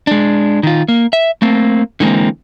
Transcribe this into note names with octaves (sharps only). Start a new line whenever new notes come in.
G#3 D4
D#3 F4
A#3
E5
A3 A#3 C4
D3 E3 G#3 A#3 C4